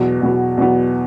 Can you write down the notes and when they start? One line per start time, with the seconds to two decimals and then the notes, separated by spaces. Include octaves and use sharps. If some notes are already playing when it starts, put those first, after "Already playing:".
Already playing: E2 B2 F#3 B3
0.21 E2 B2 F#3 B3
0.57 E2 B2 F#3 B3